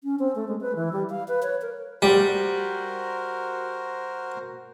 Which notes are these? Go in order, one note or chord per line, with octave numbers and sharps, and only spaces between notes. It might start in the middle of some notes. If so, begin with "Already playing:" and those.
C#4
C4
A3
G#3
B4
E3
G3
F5
B4
C#5
A#4
G3 F#4 A#4 C5